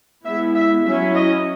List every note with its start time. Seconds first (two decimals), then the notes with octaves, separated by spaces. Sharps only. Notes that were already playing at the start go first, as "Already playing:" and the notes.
0.25 G#3 B3 E4 E5
0.55 E5
0.85 F#3 C#4 E4 E5
1.15 D#5